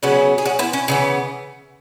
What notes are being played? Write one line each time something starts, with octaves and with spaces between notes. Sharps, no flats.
C#3 F#3 B3 C#4 F#4
G#4
C#4 F#4
B3 E4
C#4
C#3 E3 B3 C#4